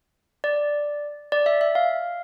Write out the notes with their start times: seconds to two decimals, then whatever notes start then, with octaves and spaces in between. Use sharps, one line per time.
0.44 D5
1.32 D5
1.46 E5
1.61 E5
1.75 F5